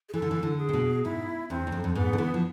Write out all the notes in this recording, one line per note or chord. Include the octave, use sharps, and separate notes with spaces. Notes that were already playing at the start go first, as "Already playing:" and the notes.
G#4
E3 A4
D3
E3
D3
G#4
C3
B2
G#2 E4
E2 C4
E2
F2
F2
G#2 B3
D3
E3
F3